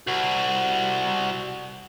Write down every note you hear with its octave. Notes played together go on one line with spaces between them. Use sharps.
C2 F#4